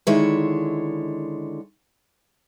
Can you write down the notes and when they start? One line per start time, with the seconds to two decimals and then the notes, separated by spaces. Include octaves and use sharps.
0.07 D3 D#3 G#3 E4 C#5